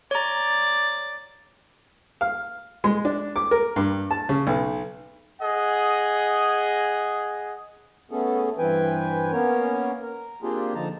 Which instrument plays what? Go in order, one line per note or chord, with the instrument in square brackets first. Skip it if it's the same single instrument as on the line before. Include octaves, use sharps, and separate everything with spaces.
[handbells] C#5 A#5 [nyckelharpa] D5
[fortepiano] F5
G#3
D4
D6
A#4
G2
A5
C#3
B1
[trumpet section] G#4 D#5 F#5
[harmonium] A3 B3 C#4 G#4 A4
G2 E3 C4 B4 G5 G#5
A#3 B3 C#4 A#4 C#5
A#4
A#3 C4 D4 F4 G4 G#4
D3 F3 D#4 A5 A#5